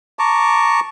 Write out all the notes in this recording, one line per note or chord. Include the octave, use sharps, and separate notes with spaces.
A5 A#5 C#6 D6